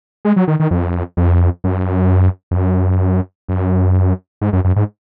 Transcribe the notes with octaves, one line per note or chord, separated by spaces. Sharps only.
G#3
F#3
D#3
D#3
F2
F2
F#2
F2
F#2
F#2
G#2
F#2
F#2
G#2